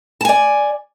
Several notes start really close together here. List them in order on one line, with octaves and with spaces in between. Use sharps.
A5 G#5 D5